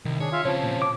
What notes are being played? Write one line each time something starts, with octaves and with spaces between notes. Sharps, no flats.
C2 D#3
D4 G#4 C#5
F4 E5 F5
C#3 F3 C4 C#5 A5
A#2
D6